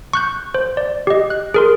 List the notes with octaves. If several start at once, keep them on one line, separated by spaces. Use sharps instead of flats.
C#6 F#6 G6
C5
D5
G4 D#5
F#6
G#4 A#4 C6